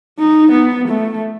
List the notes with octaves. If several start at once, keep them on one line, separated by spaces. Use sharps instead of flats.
D#4
B3
A3